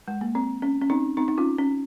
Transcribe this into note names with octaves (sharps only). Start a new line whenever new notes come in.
G#3
A#3
C4
C#4
C#4
C4 D#4
C4 D#4
D#4
C#4 F4
C#4